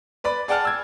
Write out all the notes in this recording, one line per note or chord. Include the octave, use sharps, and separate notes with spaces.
B4 D5 B5
G#4 D5 F#5 G5 A5 F6
E6 G#6